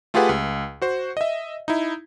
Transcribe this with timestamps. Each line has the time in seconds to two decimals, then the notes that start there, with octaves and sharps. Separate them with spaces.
0.14 A3 F4 G4 G#4 B4 F#5
0.29 C#2
0.82 F#4 C5
1.17 D#5 E5
1.68 D#4 E4